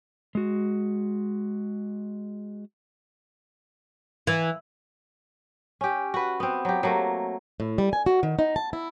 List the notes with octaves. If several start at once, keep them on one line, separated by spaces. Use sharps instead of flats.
G#3 F#4
E3
C#4 G4
F#4 B4
B3 C4
F#3 G4
F#3 A3 A#3
A2
G3
G#5
F#4
D#3
D#4
A5
E4